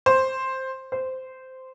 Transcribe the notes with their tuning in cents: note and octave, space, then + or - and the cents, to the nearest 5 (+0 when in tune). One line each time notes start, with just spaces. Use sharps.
C5 +5
C5 -10